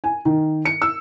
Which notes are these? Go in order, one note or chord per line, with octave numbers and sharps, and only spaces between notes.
G#5
D#3
C#7
E6